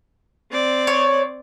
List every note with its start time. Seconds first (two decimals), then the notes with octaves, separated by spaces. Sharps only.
0.52 C4 D5
0.87 C#5